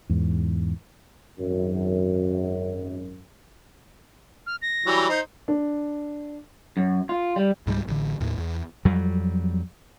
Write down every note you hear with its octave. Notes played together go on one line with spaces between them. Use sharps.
E2 G#2
G#1 F#2
F6
A#6
E3 F#3 G3
D#4 C5
D4
F#2
F4
G3
C#2 G#2 F#3 G3
A1 D3
D#2 A2
E2
F2 F#3 G3